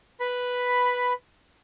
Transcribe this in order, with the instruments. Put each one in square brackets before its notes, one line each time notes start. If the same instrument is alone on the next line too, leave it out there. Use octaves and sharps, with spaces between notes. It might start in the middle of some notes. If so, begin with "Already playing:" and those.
[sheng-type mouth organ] B4 B5